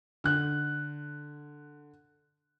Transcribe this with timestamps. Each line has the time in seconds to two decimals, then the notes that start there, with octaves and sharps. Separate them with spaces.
0.24 D3 F#6